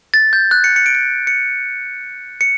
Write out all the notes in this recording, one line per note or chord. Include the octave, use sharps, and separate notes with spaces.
A6
G6
F#6
C#7
C#7
D7
C#7
C#7
C#7